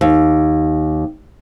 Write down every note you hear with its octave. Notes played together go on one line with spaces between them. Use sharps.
D#2